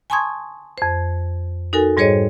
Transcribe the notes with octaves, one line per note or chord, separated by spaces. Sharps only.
G#5 A5 C6 C#6 D#6 G#6
F2 C5
D#4 F#4 A4 A#4 G#5
G#2 G3 G#4 C5 C#5 D#5